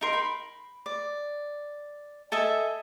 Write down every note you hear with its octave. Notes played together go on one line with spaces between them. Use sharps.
D#4 A#4 C6
B5
D5
A4 D#5 E5 G#5